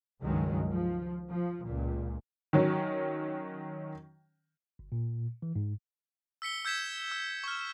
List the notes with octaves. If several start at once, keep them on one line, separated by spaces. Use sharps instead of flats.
C#2 G2 D#3 F#3 G#3
F3
F3
C#2 A#2
D#3 F#3 C#4
G1
A#2
E3
G#2
E6 B6 C#7 G7
E6 G6 G#6 B6 E7
E6
C#6 F6